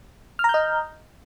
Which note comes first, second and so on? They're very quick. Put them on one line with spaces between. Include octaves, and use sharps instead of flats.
F6 A#5 G6 D#5